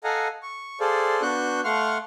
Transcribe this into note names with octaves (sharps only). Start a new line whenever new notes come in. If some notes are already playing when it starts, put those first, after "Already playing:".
A4 D#5 F5 F#5 G#5 A#5
C#6
G#4 A4 C5 D5 F5
B3 D4 F#4 C#6 F#6 G6
A3 F5 F#5 C6 C#6 F6